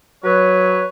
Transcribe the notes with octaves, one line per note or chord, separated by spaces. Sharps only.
F#3 B4 C#5